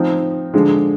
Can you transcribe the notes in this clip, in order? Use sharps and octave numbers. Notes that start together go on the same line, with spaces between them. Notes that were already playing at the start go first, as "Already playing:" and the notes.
Already playing: F3 C4 D#4
D3 F3 G#3